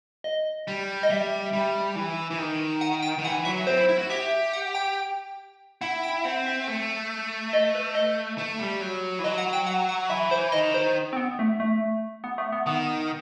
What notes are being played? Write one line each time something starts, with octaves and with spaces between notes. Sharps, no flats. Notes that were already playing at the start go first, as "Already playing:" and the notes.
D#5
G3
D#5
G3 E5
G3
E3
E3
D#3
F#5
G5
D#3
E3 F#5
F#3 E5
C4 C5
E4
E4
F#4
G4 E5
F#5
G5
E4 F#5
G5
C4 F#5
E5
A3
D#5
B4
D#5
A3
G3
F#3
E3
F#3 D#5
F#5
G5
F#5
F#5
E3 E5
C5
D#3 D#5
C5
C4
B3
A3
A3
B3
A3
B3
D#3 B3